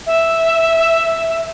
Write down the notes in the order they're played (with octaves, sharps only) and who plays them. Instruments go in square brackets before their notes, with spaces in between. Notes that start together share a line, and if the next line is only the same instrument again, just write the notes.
[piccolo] E5